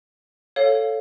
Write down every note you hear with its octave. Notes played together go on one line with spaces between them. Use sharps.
A4 C#5 F5